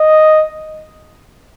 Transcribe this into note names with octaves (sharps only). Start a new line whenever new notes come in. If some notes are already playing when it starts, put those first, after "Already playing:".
Already playing: D#5